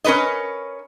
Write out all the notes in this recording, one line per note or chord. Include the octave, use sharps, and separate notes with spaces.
C#4 A#4 B4 C#5 D#5